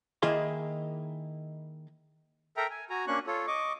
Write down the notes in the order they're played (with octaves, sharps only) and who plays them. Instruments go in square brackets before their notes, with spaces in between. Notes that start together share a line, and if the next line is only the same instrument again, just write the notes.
[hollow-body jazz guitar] D#3 A#3 E4 G#4 F5 C6
[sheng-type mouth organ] A4 A#4 E5 G5 A#5
G#5
F#4 G#5 A#5
A#3 C#4 D4 C#6 F#6
F4 A4 C#5
D#5 C#6 D6